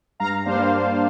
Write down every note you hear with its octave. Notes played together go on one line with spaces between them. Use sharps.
G2 F5 A#5
G3 A#3 D4 C5 F5